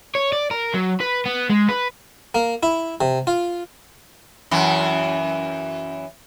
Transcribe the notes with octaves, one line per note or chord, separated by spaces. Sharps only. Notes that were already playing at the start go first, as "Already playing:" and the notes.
C#5
D5
A#4
F#3
B4
B3
G#3
B4
A#3
E4
C3
F4
F#2 E3